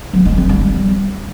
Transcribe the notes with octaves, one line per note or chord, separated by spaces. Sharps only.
F#3
G#3
C4
G3
G3